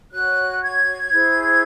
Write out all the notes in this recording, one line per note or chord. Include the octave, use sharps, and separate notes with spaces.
F#4 C#5 F#6
G#6
E4 G#4 C5